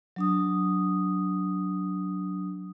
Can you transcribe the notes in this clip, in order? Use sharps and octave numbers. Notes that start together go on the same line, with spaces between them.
F#3 D4 D#6